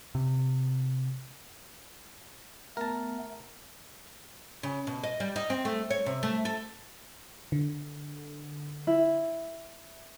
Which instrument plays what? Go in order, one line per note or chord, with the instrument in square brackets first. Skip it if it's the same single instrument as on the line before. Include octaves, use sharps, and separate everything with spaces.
[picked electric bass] C3
[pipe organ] A3 B3 [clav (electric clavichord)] A#4 A5
[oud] C#3
B2
D#5
G3
D#4
C4
A3
C#5
C3
A3
A4
[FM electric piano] D3
[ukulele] E4